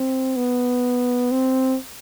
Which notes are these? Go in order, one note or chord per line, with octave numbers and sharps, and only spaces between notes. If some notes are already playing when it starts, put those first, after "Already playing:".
Already playing: C4
B3
C4